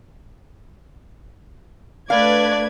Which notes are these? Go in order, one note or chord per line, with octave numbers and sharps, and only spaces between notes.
A3 D4 B4 D5 F5 G#6